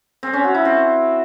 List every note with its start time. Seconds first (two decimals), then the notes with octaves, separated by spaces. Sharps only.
0.23 C4
0.33 C#4
0.44 F#4
0.55 E4
0.65 C4